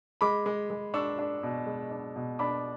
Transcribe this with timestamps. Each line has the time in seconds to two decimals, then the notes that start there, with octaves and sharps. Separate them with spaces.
0.21 G#3 B5 D6
0.46 G#3
0.70 G#3
0.94 D4 C#6 E6
1.19 D4
1.43 B2
1.66 G#3
1.91 D4
2.16 B2
2.39 D4 B5 D6